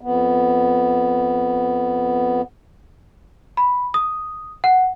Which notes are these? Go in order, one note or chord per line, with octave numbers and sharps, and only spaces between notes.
F2 B3
B5
D#6
F#5